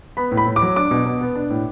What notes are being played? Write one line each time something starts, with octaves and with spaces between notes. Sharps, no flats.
B3 B5
A2
B5
A2
D6
F#3
D4 D6
B2
B2
B3
D4
A2